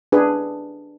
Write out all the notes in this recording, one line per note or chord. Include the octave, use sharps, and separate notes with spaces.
D4 G#4 B4